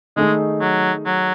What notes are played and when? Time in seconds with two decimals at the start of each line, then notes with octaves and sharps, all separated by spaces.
0.16 D#3 G#3 A3 D#4 G#4
0.61 F#3
1.06 F#3